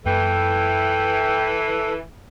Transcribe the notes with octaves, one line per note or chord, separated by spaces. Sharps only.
F#2 E3 A#3 A4 G5